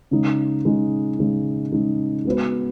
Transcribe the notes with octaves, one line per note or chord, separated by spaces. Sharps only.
C#3 G#3 D#4
C#3 G#3 D#4
C#3 G#3 D#4
C#3 G#3 D#4
G#3 B3 F#4 B4